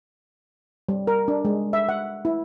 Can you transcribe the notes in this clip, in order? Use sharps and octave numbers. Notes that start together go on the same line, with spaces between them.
G3
A#4
D4
G#3
E5
F#5
E4